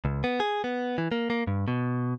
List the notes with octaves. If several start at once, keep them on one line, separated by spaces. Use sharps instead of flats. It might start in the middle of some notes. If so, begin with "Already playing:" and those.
C#2
B3
G#4
B3
E3
A#3
A#3
G2
B2